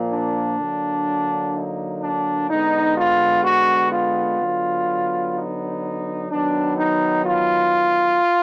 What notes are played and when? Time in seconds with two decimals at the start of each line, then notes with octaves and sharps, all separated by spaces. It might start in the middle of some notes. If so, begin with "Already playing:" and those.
Already playing: A#2 F3 A#3
0.12 D4
0.59 D3 F#3 A#3
1.55 D#4
2.02 D4
2.50 D3 G#3 B3 D#4
2.97 F4
3.45 F#4
3.93 F4
4.41 D3 F#3 B3
5.36 D#4
6.30 D#3 F#3 B3 D4
6.78 D#4
7.26 F4